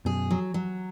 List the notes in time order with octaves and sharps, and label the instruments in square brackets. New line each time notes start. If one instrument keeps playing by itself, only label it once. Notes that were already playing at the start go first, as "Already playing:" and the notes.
[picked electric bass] F#2 B2 [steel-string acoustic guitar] G#4
[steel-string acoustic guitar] F#3
F#3